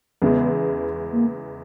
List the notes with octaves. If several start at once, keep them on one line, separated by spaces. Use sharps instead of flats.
E2 C#3 E3 G#3 B3
A#3